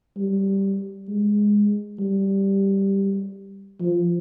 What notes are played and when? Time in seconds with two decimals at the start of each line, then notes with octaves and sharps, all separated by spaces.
0.17 G3
1.08 G#3
1.99 G3
3.81 F3